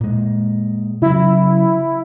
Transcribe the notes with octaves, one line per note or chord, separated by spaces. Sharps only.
A#2 G#3
C#3 F#3 E4